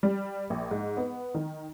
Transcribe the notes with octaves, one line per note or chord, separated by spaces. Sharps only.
G3
A#1
G#2
B3
D#3